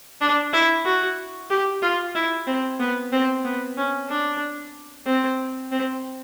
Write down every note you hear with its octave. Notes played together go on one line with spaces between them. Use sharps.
D4
E4
F#4
G4
F4
E4
C4
B3
C4
B3
C#4
D4
C4
C4